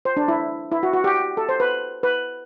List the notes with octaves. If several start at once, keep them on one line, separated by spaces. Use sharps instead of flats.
C5
D4
E4
E4
F#4
F#4
G4
A4
C5
B4
B4